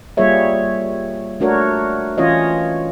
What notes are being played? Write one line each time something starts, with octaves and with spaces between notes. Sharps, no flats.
G3 A#3 F4 G#4 C#5 E5
A3 D4 F#4 A#4 C#5
E3 C#4 F4 C#5 D#5